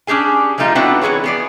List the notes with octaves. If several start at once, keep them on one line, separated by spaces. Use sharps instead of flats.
C#4 D4 G4 G#4 G#5
F3 G3 A3 D#4 F4
B3 C4 D4 E4 F#4 B4
E3 F#3 G#4 B4 C#5
B3 G#4 D5